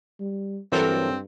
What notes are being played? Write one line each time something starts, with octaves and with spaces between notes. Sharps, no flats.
G3
G2 E3 F#3 C4 A4 A#4 C5